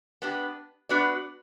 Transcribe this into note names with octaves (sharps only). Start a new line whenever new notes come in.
B3 D4 G4
B3 D4 F#4 B4 D5